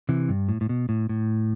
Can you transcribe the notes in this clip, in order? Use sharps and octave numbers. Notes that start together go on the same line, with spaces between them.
C3 E3
G2
A2
A2
B2
A2
A2